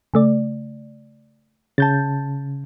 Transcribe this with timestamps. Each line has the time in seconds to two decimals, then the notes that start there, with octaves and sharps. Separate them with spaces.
0.14 C#3 A3 D5
1.78 C#3 A5 G6 A6